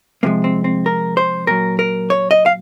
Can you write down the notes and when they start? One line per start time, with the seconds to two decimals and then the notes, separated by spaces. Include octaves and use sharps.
0.23 C3 F3 G#3 A#3
0.44 C4
0.64 C4
0.86 A#4
1.17 C5
1.47 A#2 F#3 A#4
1.79 A#4
2.10 C#5
2.31 D#5
2.46 F5